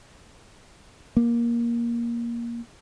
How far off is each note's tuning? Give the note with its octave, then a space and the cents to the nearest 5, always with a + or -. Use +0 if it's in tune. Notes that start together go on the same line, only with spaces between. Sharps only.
A#3 +15